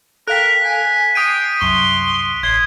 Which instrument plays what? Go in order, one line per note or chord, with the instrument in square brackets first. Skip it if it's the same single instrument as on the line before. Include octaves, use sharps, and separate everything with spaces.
[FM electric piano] A4 F5 G5 [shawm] A#4 [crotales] F#6 B6
[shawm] G#5
[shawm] G5 [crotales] D#6 D7 D#7 [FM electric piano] G#6 C7
[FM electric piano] C2 F#2 C#6 [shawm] C6
[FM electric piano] A1 B6 [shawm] C6 [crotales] G#6